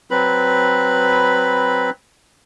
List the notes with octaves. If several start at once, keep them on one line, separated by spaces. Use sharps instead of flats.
F#3 C4 B4 B5